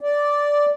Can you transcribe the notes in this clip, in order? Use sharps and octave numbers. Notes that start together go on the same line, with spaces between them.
D5